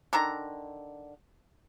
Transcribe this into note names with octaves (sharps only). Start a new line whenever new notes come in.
D3 D#3 A#5